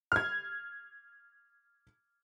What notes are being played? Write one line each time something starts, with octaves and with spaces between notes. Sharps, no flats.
F6 G#6